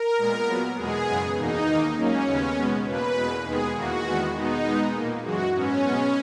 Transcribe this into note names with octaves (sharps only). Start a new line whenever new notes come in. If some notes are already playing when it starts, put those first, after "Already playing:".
Already playing: A#4
A#2 G#3 B3
A#2 F#3 B3
E2 B2 G#3 B3 G#4
F#2 C#3 G#3 B3
E2 B2 A#3 D#4
D#2 D#3 A#3
G#2 F#3 A#3 C#4
D#2 C#3 G#3 B3
B2 G#3 B3
E2 B2 A#3 B4
E2 B2 G#3
D#2 D#3 G#3 B3 G#4
E2 D#3 A#3 F#4
E2 D#3 G#3 B3
B2 G#3 B3 D#4
B2 G#3 B3
A#2 A#3
F#2 E3 G#3 F#4
G#2 F#3 B3 C#4
B2 G#3 B3